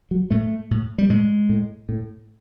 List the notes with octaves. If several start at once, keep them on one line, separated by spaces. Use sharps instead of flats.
F#3
A2 A3
A2
G3
A2 G#3
A2
A2